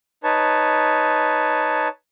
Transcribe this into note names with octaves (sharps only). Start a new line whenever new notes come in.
D#4 B4 C#5 A5